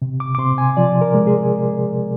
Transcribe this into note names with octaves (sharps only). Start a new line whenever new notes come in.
C3
D6
D6
C3 C6
G#5
F3 D5
A#4
G#3
G#4